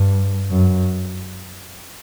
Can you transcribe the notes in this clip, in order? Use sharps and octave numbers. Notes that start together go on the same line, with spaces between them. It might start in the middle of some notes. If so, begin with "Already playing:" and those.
Already playing: G2
F#2